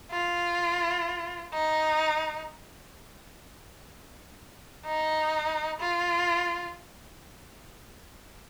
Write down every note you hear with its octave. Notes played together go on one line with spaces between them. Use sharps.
F4
D#4
D#4
F4